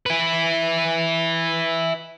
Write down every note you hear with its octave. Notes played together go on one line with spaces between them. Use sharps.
E4 B4